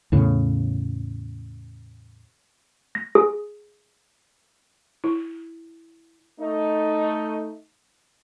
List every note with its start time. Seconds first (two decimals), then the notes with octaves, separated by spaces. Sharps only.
0.12 E2 A2 C#3
2.95 A#6
3.15 G#4
5.04 E4
6.40 A3 D#4